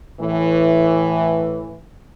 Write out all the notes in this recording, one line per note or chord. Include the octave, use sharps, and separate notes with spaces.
A2 E3